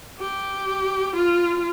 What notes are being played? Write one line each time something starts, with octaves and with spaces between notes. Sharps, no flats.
G4
F4